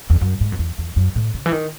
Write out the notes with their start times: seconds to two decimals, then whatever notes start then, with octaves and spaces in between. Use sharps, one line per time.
0.10 E2
0.21 F#2
0.40 G#2
0.52 F#2
0.59 E2
0.78 E2
0.96 F#2
1.15 A2
1.34 C#3
1.46 E3
1.52 D#3